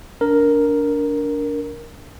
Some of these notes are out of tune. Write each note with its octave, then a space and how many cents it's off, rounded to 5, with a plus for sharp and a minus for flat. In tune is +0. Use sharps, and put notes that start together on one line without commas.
D4 -25 A#4 +0